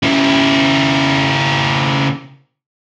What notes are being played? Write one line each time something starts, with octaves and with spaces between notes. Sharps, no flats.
C#3 E4